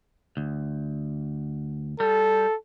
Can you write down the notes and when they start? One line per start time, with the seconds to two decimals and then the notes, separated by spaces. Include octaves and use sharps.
0.37 D2
2.00 G3 A4